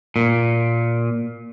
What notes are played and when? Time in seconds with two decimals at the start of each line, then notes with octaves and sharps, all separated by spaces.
0.16 A#2